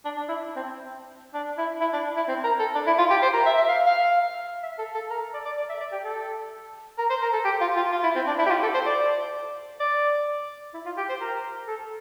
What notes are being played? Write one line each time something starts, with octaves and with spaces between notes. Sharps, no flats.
D4
D4
E4
C4
D4
E4
E4
D4
E4
C4
A#4
A4
D4
E4
F4
G4
C5
A#4
E5
E5
F5
F5
E5
A4
A4
A#4
D5
D5
D5
E5
D5
G4
A4
A#4
C5
A#4
A4
G4
F4
F4
F4
E4
C4
D4
E4
G4
F4
A4
C5
D5
D5
E4
F4
G4
C5
A#4
A4